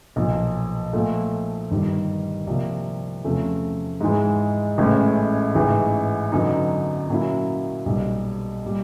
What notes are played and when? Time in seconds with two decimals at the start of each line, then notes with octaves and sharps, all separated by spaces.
0.16 B1 A#2 F3
0.93 A#2 F3 A3
1.71 G1 G2 D#3 G3
2.47 C2 C3 F3 A#3
3.24 E2 C3 F3 A3 C#4
4.01 G#2 E3 G#3
4.78 A1 A2 E3 G#3 C#4
5.55 A1 G#2 E3
6.32 F#2 D3 F#3 B3 D#4
7.09 A#2 F#3 A#3 C#4 E4
7.86 B1 A#2 G3 B3
8.65 A#2 G3